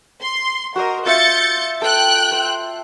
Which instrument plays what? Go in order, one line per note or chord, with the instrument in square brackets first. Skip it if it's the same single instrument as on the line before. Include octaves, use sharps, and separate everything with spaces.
[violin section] C6
[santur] F#4 C5 D#5 [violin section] A#4
[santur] F4 E5 [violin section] G6 A6 C#7
[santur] A4 [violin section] G5 F#6
[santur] C5